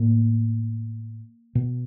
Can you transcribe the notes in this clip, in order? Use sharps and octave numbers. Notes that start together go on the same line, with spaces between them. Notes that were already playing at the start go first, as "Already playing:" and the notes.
Already playing: A2 A#3
B2